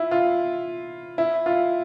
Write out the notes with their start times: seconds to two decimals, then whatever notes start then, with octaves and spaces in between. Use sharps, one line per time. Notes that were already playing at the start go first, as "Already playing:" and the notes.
Already playing: E4 F4
0.11 F4
1.18 E4
1.46 F4